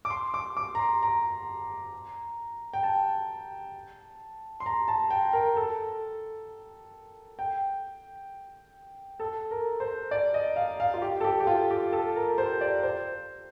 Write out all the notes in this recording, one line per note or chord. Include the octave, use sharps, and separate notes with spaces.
D6
C6
D6
D6
A#5
C6
A#5
G5
A5
C6
A#5
A5
G5
A#4
A4
G5
A4
A#4
C5
D5
D#5
F5
F5
F4
G4
A4
G4
G4
F4
G4
A4
A#4
C5
D5
C5